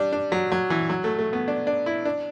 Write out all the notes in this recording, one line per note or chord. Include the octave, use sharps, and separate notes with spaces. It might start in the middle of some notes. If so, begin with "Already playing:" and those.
Already playing: G3 D4
D4
F#3
F#3
E3
F#3
A3
A3
B3
D4
D4
E4
D4